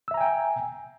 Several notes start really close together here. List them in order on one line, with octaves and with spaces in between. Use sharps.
E6 E5 A#5 G#5 G5